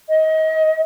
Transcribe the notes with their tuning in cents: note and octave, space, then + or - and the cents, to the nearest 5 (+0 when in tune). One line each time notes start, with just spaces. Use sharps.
D#5 +25